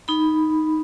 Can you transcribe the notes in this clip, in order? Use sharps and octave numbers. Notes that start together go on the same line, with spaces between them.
D#4 B5